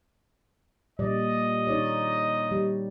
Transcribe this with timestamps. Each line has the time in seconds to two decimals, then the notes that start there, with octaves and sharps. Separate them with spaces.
0.99 A#2 G3 D5 D#5
1.67 D#4 C#5 D5
2.51 G3